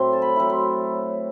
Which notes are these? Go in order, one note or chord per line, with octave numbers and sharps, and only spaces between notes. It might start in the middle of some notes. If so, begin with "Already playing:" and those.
Already playing: A2 F#3 C4 E4 C6
A5
B5
F#3 C4 E4
C6